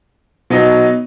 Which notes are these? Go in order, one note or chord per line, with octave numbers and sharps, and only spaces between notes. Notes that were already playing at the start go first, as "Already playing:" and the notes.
B2 F#3 B3 D#4